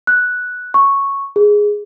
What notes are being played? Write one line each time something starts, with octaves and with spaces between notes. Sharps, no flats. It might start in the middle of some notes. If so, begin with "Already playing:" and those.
F#6
C#6
G#4